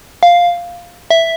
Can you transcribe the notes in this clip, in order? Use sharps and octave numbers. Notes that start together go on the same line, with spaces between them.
F5
E5